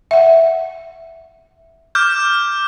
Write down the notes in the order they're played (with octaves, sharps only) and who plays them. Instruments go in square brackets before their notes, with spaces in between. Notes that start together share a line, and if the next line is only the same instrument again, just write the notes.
[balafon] E5 F#5
[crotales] D6 F6 G6